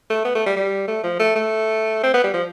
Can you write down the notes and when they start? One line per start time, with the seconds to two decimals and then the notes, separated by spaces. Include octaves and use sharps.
0.10 A3
0.25 B3
0.35 A3
0.46 G3
0.56 G3
0.88 A3
1.04 F3
1.19 A3
1.35 A3
2.03 C4
2.14 B3
2.24 G3
2.34 F3